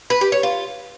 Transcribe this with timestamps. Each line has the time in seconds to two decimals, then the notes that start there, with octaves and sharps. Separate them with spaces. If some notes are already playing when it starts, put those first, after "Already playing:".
0.10 B4
0.21 G4
0.32 C#5
0.43 F4